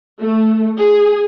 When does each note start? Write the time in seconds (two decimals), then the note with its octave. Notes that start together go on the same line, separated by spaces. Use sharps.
0.21 A3
0.77 G#4